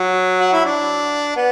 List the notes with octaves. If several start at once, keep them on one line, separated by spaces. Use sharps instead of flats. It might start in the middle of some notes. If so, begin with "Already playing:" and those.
Already playing: F#3
F#4
E4
D4
B3